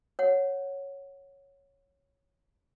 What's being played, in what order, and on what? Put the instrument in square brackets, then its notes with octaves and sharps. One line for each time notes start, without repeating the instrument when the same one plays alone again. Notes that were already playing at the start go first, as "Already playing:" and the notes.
[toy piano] C#5 F#5